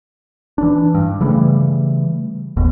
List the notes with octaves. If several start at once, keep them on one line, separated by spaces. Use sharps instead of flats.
E3 D4
G2
C#3 E3 G3 A3
F#1 D#2 B2